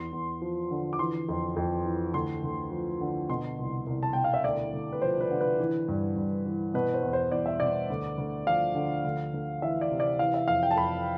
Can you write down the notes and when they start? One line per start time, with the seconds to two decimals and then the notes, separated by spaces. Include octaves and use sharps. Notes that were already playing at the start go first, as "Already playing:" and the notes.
Already playing: E2 C6
0.12 E2
0.42 F3
0.71 D3
0.93 D6
0.99 E3 C6
1.29 F2
1.56 F2
1.85 E3
2.14 D2 C6
2.43 D2
2.71 F3
3.01 D3
3.29 B2 C6
3.58 C2
3.87 C2
4.03 A5
4.13 B2 G5
4.24 F5
4.34 E5
4.44 D2 D5
4.73 D2
4.93 B4
5.01 F3 C5
5.21 B4
5.31 D3
5.41 B4
5.60 E3
5.88 G2
6.16 G2
6.46 E3
6.74 B2 B4
6.94 C5
7.03 E2
7.13 C5
7.31 E2 D5
7.46 E5
7.60 B2 D5
7.90 D2
8.18 D2
8.47 F3 F5
8.75 D3
9.04 D2
9.34 D2
9.62 E3 E5
9.81 D5
9.91 C3
10.00 D5
10.19 E3 F5
10.34 E5
10.48 F2 F5
10.63 G5
10.71 A5
10.76 F2 B5